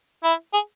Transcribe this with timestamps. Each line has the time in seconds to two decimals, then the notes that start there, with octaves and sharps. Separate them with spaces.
0.23 E4
0.53 G#4